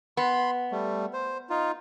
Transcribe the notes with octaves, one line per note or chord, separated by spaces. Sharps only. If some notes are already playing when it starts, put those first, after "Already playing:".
B3 B5 C6
G3 A3
C5
D#4 F4